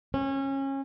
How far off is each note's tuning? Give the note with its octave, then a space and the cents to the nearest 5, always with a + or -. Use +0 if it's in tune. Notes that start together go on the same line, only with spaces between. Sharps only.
C#4 -25